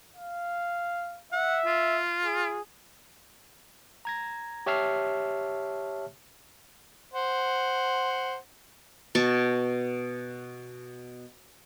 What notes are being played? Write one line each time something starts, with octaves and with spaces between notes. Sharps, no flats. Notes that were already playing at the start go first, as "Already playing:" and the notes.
F5
E5 F#5
F4
G#4
A#5 G#6 A#6
G4 C#5 E5 A5 F6 C7
C5 F#5
B2 A5 C#6